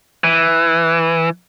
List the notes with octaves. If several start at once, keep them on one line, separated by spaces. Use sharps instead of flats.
E3